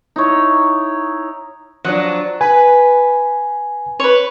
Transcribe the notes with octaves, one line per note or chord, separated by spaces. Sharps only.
D#4 E4 C#5
F3 F#3 D4 F#5
B4 G#5
B4 C#5